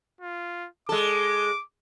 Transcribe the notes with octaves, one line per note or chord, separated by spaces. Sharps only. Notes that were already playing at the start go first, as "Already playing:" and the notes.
F4
G#3 A4 D6